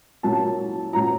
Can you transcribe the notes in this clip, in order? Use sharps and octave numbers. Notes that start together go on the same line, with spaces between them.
A#2 F#3 A#3 C#4 E4 A5
A#2 F#3 A#3 C#4 E4 A#5